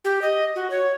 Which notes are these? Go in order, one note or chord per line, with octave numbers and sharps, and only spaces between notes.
G4
D#5
F#4
C#5